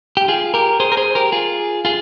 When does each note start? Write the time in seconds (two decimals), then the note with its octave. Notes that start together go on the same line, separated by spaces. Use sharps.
0.17 G4
0.28 F4 G#4
0.54 G4 A#4
0.80 G#4 C5
0.92 A#4
0.97 G#4 C5
1.15 G4 A#4
1.32 F4 G#4
1.85 F4 G#4